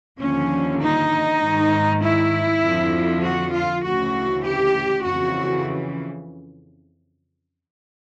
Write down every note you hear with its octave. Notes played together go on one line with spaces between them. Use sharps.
D#2 D3 F3 C#4
D#4
G#2 D#3
E4
F2 D3 F3
F#4
F4
D2 C#3 E3 F#4
G4
F2 C#3 E3 F#4